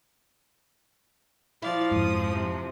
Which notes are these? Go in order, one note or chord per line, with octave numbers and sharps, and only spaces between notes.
F3 E4 D5 F5 A6
F2 G#2 D#6
C3